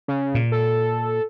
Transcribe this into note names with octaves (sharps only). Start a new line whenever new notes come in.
C#3
A#2
A4